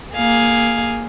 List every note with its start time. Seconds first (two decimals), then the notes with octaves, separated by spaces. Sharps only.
0.15 A#3 G#4 F5